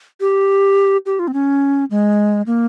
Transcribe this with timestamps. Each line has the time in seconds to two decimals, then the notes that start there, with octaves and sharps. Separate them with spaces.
0.20 G4
1.06 G4
1.19 F4
1.28 C4
1.34 C#4
1.91 G#3
2.47 A#3